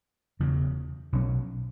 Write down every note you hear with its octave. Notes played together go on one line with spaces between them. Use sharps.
E1 E2 C#3
B1 B2 F#3 C#4